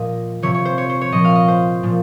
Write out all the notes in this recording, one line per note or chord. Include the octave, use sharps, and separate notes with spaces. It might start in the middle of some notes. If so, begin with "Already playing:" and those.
Already playing: A#2 F3 D#5
C3 F3 C#5
C#5
C5
C#5
C5
C#5
A#2 F3 D#5
F5
D#5
C5
A#2 F3